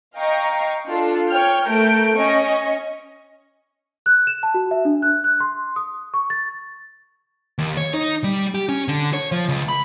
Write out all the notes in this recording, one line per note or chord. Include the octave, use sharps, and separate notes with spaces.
D#5 F5 G5 A#5 C#6
D4 F4 A4
C#5 G5 F6
A3 A#4 G6 D7
C#4 D#5 C#6
F#6
E7
A5
F#4
E5
D4
F#6
F#6
C6
D#6
C#6
A6
D#2
C#5
D#4
G3
G4
C#4
D3
C#5
F3
C#2
B5